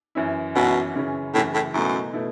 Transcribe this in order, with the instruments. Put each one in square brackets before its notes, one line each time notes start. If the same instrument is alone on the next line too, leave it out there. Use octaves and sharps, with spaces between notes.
[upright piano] F#2 E3 C#4 E4
[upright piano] F#2 E3 C#4 E4 [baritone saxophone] B2
[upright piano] F#2 C#3 E3 C#4
[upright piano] F#2 C#3 E3 C#4 [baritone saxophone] A2
[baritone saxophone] A2
[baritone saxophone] F#2 [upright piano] B2 A3 E4
[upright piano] B2 A3 E4